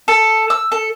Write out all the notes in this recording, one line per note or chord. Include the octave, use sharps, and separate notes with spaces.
A4
E6
A4